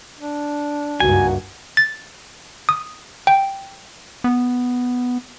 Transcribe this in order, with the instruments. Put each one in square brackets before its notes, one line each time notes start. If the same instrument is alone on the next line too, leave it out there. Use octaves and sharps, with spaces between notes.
[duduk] D4
[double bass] C#2 G2 [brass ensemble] A#3 D#4 F#4 [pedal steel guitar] G#5
[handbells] A6
D#6
G5
[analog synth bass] B3